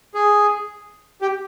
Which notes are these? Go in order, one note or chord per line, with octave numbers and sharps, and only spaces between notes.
G#4
G4